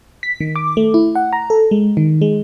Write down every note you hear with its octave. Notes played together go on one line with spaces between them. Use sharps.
B6
D#3
D6
A3
E4
F#5
A#5
A4
G#3
D#3
G#3